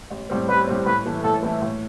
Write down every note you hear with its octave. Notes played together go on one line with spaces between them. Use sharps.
A1
A2 G3 C4
A1 B4
A2 G3 C4
A2 B4
E3 A3 E4
A2 A4
E3 A3 E4
A2